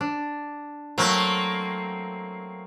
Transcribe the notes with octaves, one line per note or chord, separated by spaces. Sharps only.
D4
F#3 A3 A#3 C4